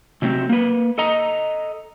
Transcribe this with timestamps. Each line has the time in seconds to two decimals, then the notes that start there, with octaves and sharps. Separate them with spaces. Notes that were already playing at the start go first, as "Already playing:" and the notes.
0.22 C3 F#3 A3 C4
0.49 A#3 B4
0.98 A4 D#5 A#5